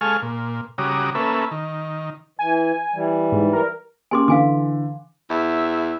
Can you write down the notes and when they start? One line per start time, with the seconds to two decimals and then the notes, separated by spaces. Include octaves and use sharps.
0.01 G#3 A4 F5 G#5 C#6 F6
0.22 A#2
0.78 C#3 G3 F#4 A#5 D6 D#6
1.15 A#3 C#4 A4 B4 E5
1.51 D#3
2.39 E3 G#5
2.94 E3 G3
3.32 G#2
3.53 A#4
4.11 A#3 C#4 G4 G#5 C6 D6
4.28 D3 E3 F5 G#5 D6
5.30 E2 E5